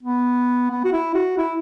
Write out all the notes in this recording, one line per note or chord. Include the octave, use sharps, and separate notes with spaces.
B3
B3
F#4
E4
F#4
E4